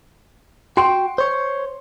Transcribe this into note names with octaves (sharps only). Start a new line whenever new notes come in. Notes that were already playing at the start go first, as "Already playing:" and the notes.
F#4 G5 C6
C5 C#5